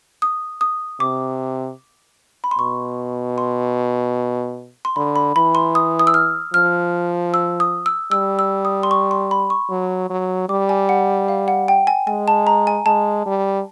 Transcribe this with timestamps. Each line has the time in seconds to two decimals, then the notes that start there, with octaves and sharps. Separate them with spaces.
0.22 D#6
0.61 D#6
1.00 C3 D6
2.44 B5
2.51 C6
2.58 B2 C#6
3.38 C6
4.85 C6
4.96 D3 B5
5.16 B5
5.36 E3 B5
5.55 C6
5.75 D#6
5.99 D#6
6.07 E6
6.14 F6
6.54 F3 F6
7.34 E6
7.60 D#6
7.86 E6
8.12 G3 E6
8.39 E6
8.65 D#6
8.83 C6
8.91 C#6
9.11 C6
9.31 B5
9.50 C#6
9.70 F#3
10.10 F#3
10.49 G3 D6
10.69 G#5
10.89 F#5
11.28 F5
11.48 F#5
11.68 G5
11.87 G#5
12.07 G#3 G#5
12.28 A5
12.47 A#5
12.67 G#5
12.86 G#3 A5
13.26 G3